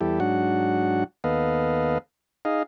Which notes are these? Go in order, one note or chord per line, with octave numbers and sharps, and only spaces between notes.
E2 G3 E4 G4 A4
G#2 F#3 D4 F#4 F#5
D#2 B3 A4 B4 D#5 F5
D#4 G#4 D#5 F5